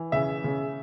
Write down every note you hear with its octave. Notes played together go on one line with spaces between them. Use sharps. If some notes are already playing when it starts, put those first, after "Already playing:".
Already playing: E3
C#3 E5
C#3